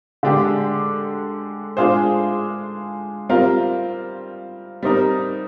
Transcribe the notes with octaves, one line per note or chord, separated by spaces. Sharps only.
D3 G#3 D4 G4
G#3 D4 F4 G#4 C5
G3 C4 F4 A#4
G3 C4 D#4 A#4